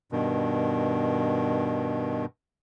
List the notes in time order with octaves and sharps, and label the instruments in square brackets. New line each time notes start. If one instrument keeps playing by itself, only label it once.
[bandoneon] G2 B2 D#3